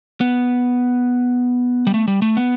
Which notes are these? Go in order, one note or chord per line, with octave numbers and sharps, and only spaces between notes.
B3
G3
A3
G3
A3
B3